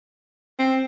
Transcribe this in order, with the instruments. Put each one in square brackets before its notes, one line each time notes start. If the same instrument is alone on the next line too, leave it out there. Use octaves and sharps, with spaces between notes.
[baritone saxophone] C4